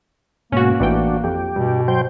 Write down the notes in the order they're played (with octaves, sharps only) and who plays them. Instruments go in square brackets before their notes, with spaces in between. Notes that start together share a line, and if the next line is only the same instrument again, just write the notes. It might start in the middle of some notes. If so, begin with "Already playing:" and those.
[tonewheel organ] G#2 B2 [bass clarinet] A#3 [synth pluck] C#4 F#4
[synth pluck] A1 E3 G5 [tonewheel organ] D4 F#4
[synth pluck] F2 [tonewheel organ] G4
[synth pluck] G2 [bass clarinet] B2
[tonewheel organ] F#3 C5 G5